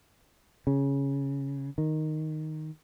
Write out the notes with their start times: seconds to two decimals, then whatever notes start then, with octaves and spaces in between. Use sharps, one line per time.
0.67 C#3
1.78 D#3